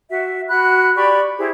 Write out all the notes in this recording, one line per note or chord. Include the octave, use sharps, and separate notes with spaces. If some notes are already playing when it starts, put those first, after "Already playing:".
F#4 E5
F#4 B5 F#6
G4 D5 B5 C#6
E4 G4 G#4 C5